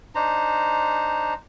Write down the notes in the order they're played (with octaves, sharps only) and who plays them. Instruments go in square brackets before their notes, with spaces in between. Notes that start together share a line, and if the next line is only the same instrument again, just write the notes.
[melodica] D4 D#4 C5 A#5